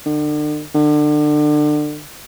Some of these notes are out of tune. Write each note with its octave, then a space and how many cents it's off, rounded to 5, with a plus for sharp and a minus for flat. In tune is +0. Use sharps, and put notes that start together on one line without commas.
D3 +40
D3 +30